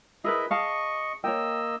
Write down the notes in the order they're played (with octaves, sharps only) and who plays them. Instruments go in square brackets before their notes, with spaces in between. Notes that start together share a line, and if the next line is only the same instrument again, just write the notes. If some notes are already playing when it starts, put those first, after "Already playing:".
[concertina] E4 D#5 E5 [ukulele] G#4 A#4 B4
[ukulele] G#4 F5 A5 [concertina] D#5 C#6
[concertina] A#3 D#5 E6 [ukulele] C#5 G5